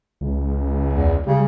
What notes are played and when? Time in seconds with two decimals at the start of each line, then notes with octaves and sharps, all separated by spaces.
0.21 C#2
0.93 E2
1.27 C#3 G3